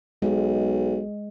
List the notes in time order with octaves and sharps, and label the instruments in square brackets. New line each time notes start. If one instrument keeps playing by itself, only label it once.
[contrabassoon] B1 [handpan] G#3